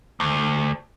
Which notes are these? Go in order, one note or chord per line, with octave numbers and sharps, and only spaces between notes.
D2